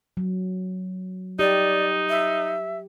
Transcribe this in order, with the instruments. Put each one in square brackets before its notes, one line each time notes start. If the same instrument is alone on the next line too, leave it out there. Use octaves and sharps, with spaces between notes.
[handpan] F#3
[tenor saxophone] D#4 [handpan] G4 [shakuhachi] D5
[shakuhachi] E5